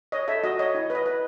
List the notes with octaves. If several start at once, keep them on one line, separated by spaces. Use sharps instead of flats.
C#5 D#5
A4 E5
F#4 D#5
C#5 D#5
E4
B4 D#5
B4